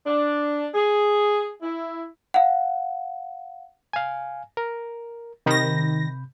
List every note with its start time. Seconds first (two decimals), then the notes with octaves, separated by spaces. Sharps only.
0.07 D4
0.75 G#4
1.62 E4
2.34 F5 F#5
3.93 F5 G#5
4.57 A#4
5.46 C3 D#3 B5 G6 A#6